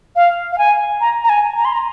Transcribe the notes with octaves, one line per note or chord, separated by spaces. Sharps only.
F5
F5
G#5
A#5
A#5
G#5
A#5
C6
A#5